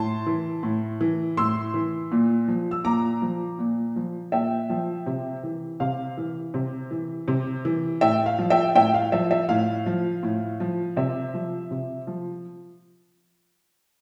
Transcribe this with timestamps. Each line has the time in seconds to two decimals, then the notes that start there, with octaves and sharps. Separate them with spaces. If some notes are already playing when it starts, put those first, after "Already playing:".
Already playing: A2 A5 C6
0.26 E3
0.63 A2
1.01 E3
1.37 A2 C6 E6
1.74 E3
2.12 A#2
2.48 F3
2.71 E6
2.84 A#2 A#5 D6
3.22 F3
3.59 A#2
3.96 F3
4.32 A#2 E5 G5
4.70 F3
5.06 C3
5.43 E3
5.80 C3 F5
6.17 E3
6.54 C3
6.91 E3
7.28 C3
7.65 E3
8.01 A2 E5 G5
8.26 F5
8.38 F3
8.50 E5 G5
8.75 A2 E5 G5
8.94 F5
9.12 F3 E5
9.31 E5
9.49 A2 F5
9.86 F3
10.23 A2
10.60 F3
10.97 C3 E5
11.34 F3
11.71 C3
12.07 F3